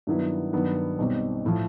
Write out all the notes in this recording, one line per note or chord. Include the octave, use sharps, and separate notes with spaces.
G2 D#3 F#3 B3 E4
G2 D#3 F#3 B3
B1 B2 G3 C4 D#4
A2 F3